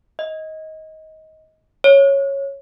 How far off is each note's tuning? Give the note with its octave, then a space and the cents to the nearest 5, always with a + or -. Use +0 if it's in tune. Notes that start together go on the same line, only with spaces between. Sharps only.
D#5 +20
C#5 -5